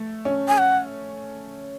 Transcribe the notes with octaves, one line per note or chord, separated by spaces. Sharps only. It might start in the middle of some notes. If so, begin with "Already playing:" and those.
Already playing: A3
C#4
G#5
F#5